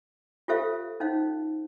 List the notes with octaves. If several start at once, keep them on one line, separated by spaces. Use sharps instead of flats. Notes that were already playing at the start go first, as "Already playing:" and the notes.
F4 G4 A4 C5 E5 F5
C#4 D#4 C5 F5